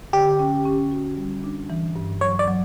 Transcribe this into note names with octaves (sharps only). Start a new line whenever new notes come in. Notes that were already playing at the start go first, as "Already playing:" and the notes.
D3 G4
C#4
C#4
F#4
G3
D4
E3
G2
F#3 C#5
D5
F#3